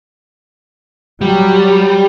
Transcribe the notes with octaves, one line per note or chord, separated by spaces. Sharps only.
F#3 G3